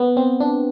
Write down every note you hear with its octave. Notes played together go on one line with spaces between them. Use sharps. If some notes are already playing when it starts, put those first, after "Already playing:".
Already playing: B3
C4
D4